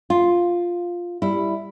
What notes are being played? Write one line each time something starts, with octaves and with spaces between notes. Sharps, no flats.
F4
G3 E4